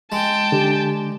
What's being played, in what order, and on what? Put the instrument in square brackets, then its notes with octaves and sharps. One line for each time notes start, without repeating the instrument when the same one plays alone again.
[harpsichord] G#3 [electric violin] G5 A5
[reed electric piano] D3 [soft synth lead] G4